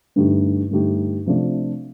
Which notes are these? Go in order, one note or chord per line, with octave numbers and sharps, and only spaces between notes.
G2 D3 A3 D#4 G4
G2 D3 A3 D#4 G4
C3 F3 A3 D4